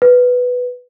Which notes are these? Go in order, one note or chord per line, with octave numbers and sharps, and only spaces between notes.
B4